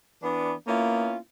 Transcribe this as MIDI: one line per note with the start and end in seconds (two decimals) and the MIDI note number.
0.23 0.52 52
0.23 0.52 59
0.23 0.52 62
0.68 1.17 58
0.68 1.17 59
0.68 1.17 61
0.68 1.17 64
0.68 1.17 65